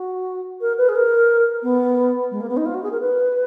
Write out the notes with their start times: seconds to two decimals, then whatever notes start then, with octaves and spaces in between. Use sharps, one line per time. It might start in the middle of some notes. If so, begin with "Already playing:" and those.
Already playing: F#4
0.61 A#4
0.78 B4
0.89 G#4
0.95 A#4
1.63 B3
2.31 G#3
2.41 A#3
2.49 B3
2.57 D#4
2.66 F4
2.74 F#4
2.83 G#4
2.91 A#4
3.01 B4